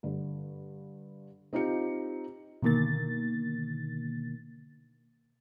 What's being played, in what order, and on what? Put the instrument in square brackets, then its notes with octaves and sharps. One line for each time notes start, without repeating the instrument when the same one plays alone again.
[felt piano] G2 D3
C4 D#4 F4 G4 C#7
[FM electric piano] B2 D3 D#3 A#3 A6